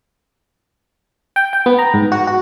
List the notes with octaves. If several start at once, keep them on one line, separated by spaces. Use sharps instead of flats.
G5
G5
B3
A#5
G#2
F#4
F#4